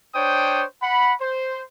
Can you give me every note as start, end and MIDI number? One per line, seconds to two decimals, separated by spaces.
0.15 0.64 62
0.15 0.64 72
0.15 0.64 73
0.15 0.64 79
0.15 0.64 87
0.82 1.13 78
0.82 1.13 83
1.21 1.61 72